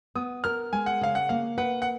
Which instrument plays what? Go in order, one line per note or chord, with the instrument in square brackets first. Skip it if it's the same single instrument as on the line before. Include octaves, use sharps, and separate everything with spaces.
[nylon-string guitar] B3 [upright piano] D#6
[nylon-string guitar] A#4 [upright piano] F6
[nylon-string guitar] G#3 [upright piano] G#5
[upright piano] F#5
[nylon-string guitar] C#3 [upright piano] F5
[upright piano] F#5
[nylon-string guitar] A#3 [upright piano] F5
[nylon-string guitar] B4 [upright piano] F#5
[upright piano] F#5